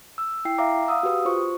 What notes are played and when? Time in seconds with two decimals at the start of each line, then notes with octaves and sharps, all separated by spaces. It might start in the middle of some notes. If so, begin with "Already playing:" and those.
0.18 E6
0.45 E4 G5 C7
0.58 E5 F5 A#5 D6
0.88 F5 F#5 D#6 E6
1.03 F#4 G4 B4 D#6
1.25 F4 C5 C#6